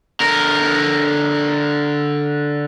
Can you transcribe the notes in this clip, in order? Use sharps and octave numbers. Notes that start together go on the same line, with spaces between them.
D3 A#4